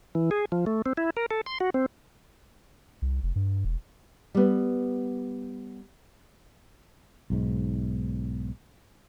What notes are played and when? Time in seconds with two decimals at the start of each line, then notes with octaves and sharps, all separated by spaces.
0.15 E3
0.31 G#4
0.52 F3
0.66 A3
0.86 C4
0.97 E4
1.17 A#4
1.31 A4
1.46 C6
1.60 F#4
1.74 C4
3.02 C2
3.23 F1
3.36 G2
3.65 E1
4.35 G3 B3
7.30 B1 G#2